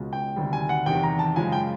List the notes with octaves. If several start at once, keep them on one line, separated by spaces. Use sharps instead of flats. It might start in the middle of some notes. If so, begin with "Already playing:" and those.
Already playing: C#2 B2 G#3 C#4
G5
D2 C3 D#3 G3
G#5
F#5
E2 C3 D#3 G5
A#5
A5
F#2 C#3 F3 G#3 G#5
G5